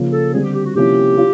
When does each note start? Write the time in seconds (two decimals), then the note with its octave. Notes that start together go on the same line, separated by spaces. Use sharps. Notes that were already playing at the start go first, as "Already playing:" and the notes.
Already playing: C#3 F3 A#3
0.13 A4
0.33 D3 G3 C4 G#4
0.44 G4
0.55 G4
0.65 F#4
0.75 C3 F3 A#3 C#4 E4 G4
1.18 F4